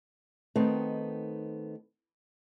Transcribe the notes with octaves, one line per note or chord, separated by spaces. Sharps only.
D#3 A3 B3 C4 D#4